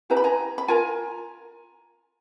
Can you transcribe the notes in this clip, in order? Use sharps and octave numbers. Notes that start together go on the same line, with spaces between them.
E4 G4 B4 A#5
B5
G#5 A#5
B5
F4 A#4 G#5 A#5